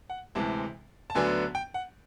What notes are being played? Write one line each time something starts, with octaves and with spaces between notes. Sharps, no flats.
F#5
D2 C3 E3 G#3 A5
A5
D2 D3 F#3 B3 D4 G#5
G5
F#5